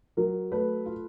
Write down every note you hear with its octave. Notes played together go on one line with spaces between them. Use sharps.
F#3 A#4
A3 B4
F4